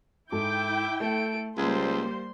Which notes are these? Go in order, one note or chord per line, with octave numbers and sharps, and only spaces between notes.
G#2 D#4 E4 A4 G5 D6
A3 A4 D7
C#2 G3 A#3 C5 C6 G#6